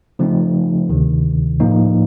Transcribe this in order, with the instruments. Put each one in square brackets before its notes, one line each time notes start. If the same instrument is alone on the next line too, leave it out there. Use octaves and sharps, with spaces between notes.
[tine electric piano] C#3 F3 A3 C4 D#4
D2 C3 D#3
A2 F3 A#3 D#4